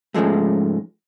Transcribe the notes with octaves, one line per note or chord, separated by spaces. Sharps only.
G#2 C#3 F3 G#3 A3